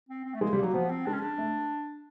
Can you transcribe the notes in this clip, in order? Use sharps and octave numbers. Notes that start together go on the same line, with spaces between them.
C4
C4
A3
G#3 A#3
G3
A#3
F#3
F3 B3
C4
G#3 D4
C#4
D4
A3